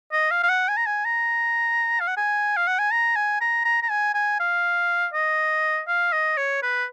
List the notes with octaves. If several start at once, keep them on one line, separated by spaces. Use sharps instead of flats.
D#5
F5
F5
F#5
G#5
A#5
G#5
A#5
F5
F#5
G#5
F5
F#5
G#5
A#5
G#5
A#5
A#5
A#5
G#5
G#5
F5
D#5
F5
D#5
C#5
B4